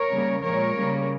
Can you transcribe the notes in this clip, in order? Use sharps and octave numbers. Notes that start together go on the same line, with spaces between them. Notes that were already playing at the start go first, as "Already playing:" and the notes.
Already playing: A#4 C#5
C#3 G3 A#3
A#2 F3 G#3 A#4 C#5
C#3 G3 A#3